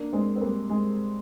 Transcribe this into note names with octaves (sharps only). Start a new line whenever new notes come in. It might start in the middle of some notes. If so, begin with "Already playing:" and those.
Already playing: A#3 D4
G#3 C4
C4
G3 A#3
G#3